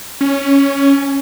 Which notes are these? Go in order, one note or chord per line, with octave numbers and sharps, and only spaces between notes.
C#4